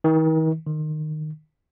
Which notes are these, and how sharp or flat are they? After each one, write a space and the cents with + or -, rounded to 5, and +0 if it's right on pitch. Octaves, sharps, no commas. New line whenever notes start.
D#3 +40
D#3 -20